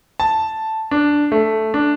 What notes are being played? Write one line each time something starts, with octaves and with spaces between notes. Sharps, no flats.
A5
D4
A3
D4